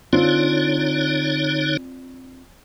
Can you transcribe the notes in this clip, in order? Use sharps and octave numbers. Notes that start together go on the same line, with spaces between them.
D3 C4 D4 D#4 F4 C#5